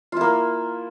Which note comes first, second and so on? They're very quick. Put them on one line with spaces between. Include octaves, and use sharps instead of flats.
F4 E4 A#3